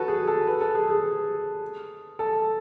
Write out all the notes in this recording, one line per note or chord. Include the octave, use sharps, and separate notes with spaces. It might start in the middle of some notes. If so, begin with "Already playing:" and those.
Already playing: F#4 A4 B4
G#4
A4
B4
A4
G#4
G#4
A4